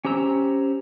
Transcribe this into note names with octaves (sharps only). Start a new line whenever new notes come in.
C#4 G4 C5 A#5 E6